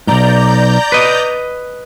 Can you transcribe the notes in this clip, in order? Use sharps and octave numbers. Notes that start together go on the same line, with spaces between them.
B1 G#2 D5 A#5 G6
B4 D#5